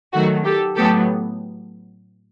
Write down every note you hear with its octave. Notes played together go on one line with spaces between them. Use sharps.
D#3 F#3 A3 F#4
G4 A4
A2 F#3 B3 G4 A4